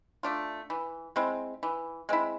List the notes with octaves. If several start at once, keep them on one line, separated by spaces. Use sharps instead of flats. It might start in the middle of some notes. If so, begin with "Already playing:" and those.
A3 D4 F4
E3
G#3 C4 E4
E3
G#3 C4 E4